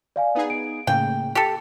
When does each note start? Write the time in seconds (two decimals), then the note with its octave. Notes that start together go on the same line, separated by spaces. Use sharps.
0.16 D5 F5 G#5
0.35 B3 D#4 G#4
0.50 D7
0.87 A2 C#3 A#3 G5
1.35 G4 A4